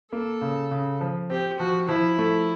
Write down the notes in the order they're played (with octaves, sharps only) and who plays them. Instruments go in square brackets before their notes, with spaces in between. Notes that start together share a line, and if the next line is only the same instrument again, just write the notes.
[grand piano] A#3 [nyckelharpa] A4
[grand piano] C#3
C#3
F3
[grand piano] C4 [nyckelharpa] G4
[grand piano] F3 [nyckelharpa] F#4
[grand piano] F3 [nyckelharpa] E4
[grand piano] A3